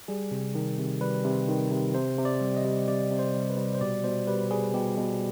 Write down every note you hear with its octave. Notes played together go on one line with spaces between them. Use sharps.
G3 G#4
C3
D#3
C3
G3 B4
C3
D#3
C3
C3 C5
C3
D5
G3
D#5
G3
C3 D5
C3
C5
G3
B4
G3
C5
B2 D5
B2 C5
G3 B4
G3 G#4
B2 G4
B2